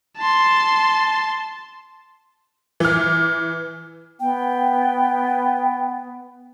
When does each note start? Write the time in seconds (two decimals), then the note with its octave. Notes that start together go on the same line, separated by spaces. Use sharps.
0.18 A5 C6
2.80 E3 F6
4.20 B3 G5